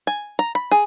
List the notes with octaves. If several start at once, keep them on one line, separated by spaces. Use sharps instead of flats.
G#5
A#5
B5
G#4